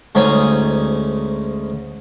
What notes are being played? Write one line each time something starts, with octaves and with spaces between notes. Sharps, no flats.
D2 G#2 C#4 D#4 C#5